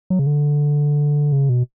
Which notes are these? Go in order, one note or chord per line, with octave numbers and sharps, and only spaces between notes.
F#3
C#3
D3
C#3
B2